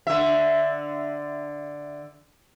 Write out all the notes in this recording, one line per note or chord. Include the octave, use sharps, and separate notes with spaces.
D3 E5